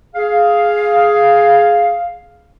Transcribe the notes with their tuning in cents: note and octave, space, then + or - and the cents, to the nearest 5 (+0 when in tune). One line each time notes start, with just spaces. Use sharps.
G#4 +10 F5 +0